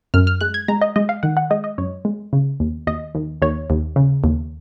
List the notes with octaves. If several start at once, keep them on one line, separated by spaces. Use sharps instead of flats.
F#2 F6
F6
G#3 F#6
G#6
G#3 A#5
D#5
G#3 D#5
F5
D#3 F#5
F#5
G#3 D#5
D#5
F#2 C#5
G#3
C#3
D#2
D#2 D#5
D#2
D#2 C#5
D#2
C#3
D#2